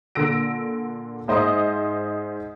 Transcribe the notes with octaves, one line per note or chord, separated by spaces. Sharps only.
A#2 D3 E6 A#6 D7
G#2 C5 D#5 E5 D#6